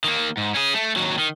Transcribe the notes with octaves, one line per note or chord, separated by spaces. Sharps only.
D#3 A#3
G#2
C#4 G#4
A3
D#2 F#3
D#3